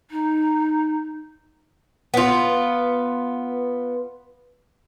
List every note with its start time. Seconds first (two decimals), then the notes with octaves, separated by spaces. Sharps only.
0.11 D#4
2.14 B3 F4